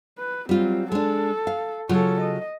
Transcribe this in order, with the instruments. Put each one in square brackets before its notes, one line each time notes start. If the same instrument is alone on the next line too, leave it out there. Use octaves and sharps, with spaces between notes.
[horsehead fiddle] B4
[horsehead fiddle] F#3 C4 [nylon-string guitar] G3 F4
[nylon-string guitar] G#3 D4 [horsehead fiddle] A4
[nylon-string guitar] F5
[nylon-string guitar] C#3 F#3 F4 [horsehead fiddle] A4 C#5
[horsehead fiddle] D#5